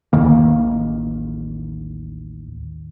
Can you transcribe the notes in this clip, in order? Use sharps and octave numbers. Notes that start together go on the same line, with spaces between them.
A1 D#2 D#3 A#3